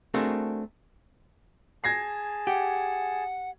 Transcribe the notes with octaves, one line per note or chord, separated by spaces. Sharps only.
A3 C4 D4 F#4 G#4 A#4
G#4 A5 G#6 A#6 C7
G4 F#5